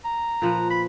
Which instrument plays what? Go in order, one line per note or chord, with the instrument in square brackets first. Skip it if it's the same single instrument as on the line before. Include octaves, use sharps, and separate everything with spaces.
[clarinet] A#5
[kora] A#2 F3 B4
[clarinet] B5